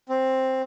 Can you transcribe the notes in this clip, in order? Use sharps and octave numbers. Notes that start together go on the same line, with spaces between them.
C4